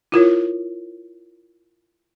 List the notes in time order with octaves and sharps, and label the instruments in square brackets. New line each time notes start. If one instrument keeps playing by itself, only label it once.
[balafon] E4 F4 A#4 C#5